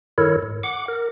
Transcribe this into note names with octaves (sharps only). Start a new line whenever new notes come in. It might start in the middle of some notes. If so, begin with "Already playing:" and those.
G2 D#3 E4 A4 A#4 C#5
G#2
F#5 D6
A#4